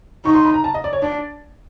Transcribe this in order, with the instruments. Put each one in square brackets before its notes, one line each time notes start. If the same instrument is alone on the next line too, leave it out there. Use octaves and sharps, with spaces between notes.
[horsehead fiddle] D#4 [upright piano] C#6
[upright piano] C6
B5
A#5
A5
D#5
D5
C#5
[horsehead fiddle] D4 [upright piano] D5